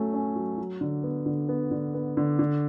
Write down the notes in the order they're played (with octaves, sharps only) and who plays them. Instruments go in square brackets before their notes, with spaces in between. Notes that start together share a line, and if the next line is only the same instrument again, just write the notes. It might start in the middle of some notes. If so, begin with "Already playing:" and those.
Already playing: [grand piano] F#3 A3 C#4
C#4
F#3
F#3
D3
B3
D3
B3
D3
B3
D3
D3